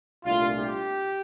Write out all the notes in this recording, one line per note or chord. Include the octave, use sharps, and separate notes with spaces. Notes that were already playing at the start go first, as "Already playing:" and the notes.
C2 A#2 A3 D4 F4
G4